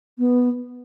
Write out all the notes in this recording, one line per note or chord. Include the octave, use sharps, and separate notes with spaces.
B3